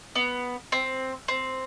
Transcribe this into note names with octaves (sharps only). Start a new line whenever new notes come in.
B3
C4
C4